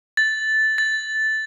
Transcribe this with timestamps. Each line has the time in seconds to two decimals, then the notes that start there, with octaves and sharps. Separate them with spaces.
0.17 A6
0.78 A6